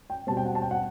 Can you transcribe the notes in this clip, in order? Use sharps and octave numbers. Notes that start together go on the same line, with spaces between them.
G5
B2 G3 C4 A5
G5
F#5
A5
G5
F#5